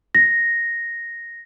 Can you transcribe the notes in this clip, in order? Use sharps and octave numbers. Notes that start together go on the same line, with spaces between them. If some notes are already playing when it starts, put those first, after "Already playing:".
A#6